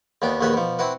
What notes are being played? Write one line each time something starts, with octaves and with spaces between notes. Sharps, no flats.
D#2 D#3 B3 D4
A#1 D#2 D#3 F#4 B4 B5
B2 F3
C4 E4 F#4 B4